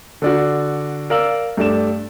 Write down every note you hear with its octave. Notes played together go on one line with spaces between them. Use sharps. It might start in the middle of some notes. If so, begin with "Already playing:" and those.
D3 D4 F#4
A#4 D5 F5 E6 F#7
G2 A3 D5 E7